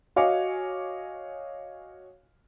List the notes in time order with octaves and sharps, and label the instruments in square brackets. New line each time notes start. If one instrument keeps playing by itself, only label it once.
[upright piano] F#4 C#5 D#5 F5 G#5 D6